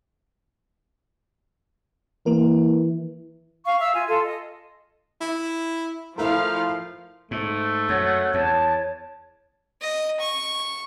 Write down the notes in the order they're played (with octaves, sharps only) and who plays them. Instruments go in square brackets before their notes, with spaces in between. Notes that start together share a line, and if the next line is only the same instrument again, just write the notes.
[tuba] E3 [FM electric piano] A#3 A#4
[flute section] F5 C#6
E5 F5 E6
F4 G#5
F4 A4 F5 C6
D#5
[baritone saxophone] E4
[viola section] F3 F5 [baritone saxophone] A3 [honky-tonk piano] E4 A#4
[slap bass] G#2 [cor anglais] A3
[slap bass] F#2 [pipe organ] C#5 [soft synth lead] F#5
[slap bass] E2 [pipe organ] C#5 [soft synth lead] A5
[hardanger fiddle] D#5
C#6